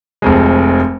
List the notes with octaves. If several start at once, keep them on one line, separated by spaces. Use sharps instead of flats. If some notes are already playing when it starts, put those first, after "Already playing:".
F1 F2 G#3